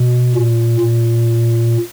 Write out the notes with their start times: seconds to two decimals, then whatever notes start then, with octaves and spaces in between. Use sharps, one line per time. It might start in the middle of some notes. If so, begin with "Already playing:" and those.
Already playing: B2
0.35 A#2
0.80 A#2